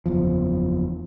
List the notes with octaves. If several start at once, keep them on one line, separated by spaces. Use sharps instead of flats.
F#1 E2 F3